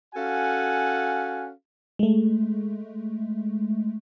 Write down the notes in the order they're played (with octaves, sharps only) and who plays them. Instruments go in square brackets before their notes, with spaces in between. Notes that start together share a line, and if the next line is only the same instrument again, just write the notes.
[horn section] C#4 F#4 A4 F5 F#5 G#5
[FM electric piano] G#3 A3